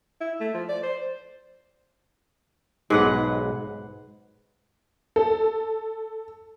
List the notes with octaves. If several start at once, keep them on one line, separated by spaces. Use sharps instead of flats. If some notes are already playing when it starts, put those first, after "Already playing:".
E4
A3
F3
D5
C5
B1 G#2 G#3 B4 F#5
A4